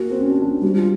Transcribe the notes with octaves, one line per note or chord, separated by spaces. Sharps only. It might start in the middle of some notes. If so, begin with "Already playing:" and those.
Already playing: A#3 F#4
C4
C#4
D4
D4
G3 F#4
F4